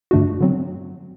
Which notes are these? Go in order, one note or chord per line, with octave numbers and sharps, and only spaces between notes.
G2 D3 A3 D4 F#4
D3 F#3 C4